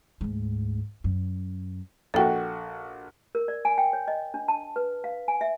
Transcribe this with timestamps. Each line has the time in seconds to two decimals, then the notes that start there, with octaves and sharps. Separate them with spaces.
0.21 D2 G#2
1.04 F#2
2.14 A#1 F#4 A4 G5
3.35 A#4
3.48 D5
3.65 G#5
3.78 G5
3.93 C#5
4.08 D#5
4.34 D4
4.48 A5
4.76 B4
5.04 F5
5.28 G#5
5.41 E5